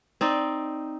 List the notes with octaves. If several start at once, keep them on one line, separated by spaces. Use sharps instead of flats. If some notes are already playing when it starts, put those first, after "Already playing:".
C4 D#4 D5